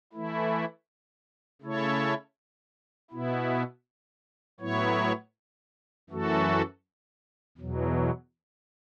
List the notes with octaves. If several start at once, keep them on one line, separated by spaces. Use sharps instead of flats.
E3 A3 E4
C#3 A3 E4 A4 C#5
B2 B3 E4
A2 F#3 B3 E4 C#5
F#2 E3 A3 F#4 A4
E2 B2 F#3